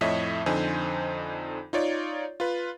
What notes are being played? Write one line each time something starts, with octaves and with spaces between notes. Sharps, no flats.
F2 A2 C#5 D#5 E5 B6
F2 D3 D#4 C5 G#5
D#4 F4 C#5 D5
F4 B4